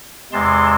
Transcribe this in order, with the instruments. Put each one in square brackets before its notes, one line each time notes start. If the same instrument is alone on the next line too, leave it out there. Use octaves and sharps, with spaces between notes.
[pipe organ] E2 C3 G#3 A5 C6